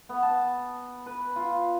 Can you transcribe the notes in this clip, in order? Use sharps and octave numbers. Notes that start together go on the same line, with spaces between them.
B3
A5
B4
F4